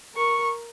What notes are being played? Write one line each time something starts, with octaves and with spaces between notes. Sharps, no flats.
A#4 C#6